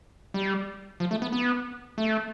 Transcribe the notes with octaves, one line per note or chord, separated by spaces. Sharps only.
G3
F3
A3
B3
B3
A3